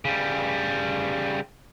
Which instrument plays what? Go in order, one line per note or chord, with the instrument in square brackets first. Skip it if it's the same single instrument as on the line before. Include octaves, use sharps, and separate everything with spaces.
[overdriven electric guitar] C#3 G3